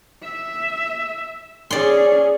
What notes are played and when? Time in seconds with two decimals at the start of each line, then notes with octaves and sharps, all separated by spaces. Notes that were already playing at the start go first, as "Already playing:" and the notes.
0.24 E5
1.71 C#4 G#4 D5 C6